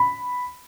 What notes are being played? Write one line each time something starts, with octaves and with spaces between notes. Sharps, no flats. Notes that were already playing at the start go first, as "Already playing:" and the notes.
Already playing: B5